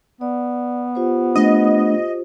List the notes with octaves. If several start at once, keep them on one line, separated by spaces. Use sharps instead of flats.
B3 D5
F4 G4 C5
A3 D4 D#5